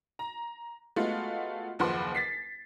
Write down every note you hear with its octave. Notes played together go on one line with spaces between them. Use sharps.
A#5
G#3 A3 B3 F4 F#4
F#1 D#2 F3 B4 F#5 C6
A6 B6 C7